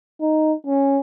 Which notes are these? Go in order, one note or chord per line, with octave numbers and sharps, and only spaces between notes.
D#4
C#4